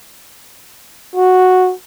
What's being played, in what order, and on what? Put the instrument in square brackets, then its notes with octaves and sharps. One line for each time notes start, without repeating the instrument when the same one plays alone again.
[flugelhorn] F#4